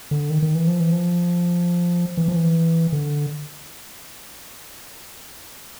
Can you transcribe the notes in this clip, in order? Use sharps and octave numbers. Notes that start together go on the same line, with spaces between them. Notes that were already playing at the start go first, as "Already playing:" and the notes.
D3
D#3
D#3
E3
F3
E3
F3
E3
F3
E3
D3